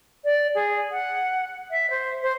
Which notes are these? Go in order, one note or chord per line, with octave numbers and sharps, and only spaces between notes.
D5
G#4
F#5
E5
C5
C5